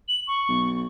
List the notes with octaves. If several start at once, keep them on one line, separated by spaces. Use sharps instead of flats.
F#7
C#6
B1